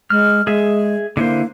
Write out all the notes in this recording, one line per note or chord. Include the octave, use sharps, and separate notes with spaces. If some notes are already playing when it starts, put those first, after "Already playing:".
G#3 F6
G#3 G#4 E5
D3 A#3 E4 C5